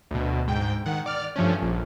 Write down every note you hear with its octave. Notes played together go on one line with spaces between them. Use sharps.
D2 B2
G#2 G5
D#3 F#5
D5 F6
G2 F3 A3 C#4
A#1